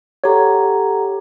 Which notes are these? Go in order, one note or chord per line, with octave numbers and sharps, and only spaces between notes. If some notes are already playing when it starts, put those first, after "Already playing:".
G4 A4 C#5 F#5 A#5